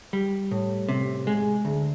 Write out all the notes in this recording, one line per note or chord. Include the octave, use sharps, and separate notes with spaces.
G3
A2
C3
G#3
D2